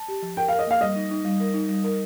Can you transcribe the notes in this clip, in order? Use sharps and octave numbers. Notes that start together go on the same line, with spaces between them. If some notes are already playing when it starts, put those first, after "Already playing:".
Already playing: A5
G4
F3
A#4 G5
A#4 F5
D#5
A#3 F5
G3 D#5
D#4
D#4
G3
A#4
D#4
G3
A#4